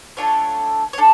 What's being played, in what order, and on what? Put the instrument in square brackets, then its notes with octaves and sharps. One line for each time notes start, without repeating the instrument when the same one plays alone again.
[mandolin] A3 D4 F4 A4 C#5
C#5
D4 A4